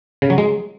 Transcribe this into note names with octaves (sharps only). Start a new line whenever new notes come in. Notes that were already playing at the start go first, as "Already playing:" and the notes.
C#3
F#3
G#3